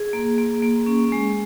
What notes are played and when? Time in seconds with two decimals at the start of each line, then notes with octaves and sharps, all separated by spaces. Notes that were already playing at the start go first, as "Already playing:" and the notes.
Already playing: G#4
0.13 A#3
0.38 A#3
0.63 A#3
0.86 C#4
1.12 G#3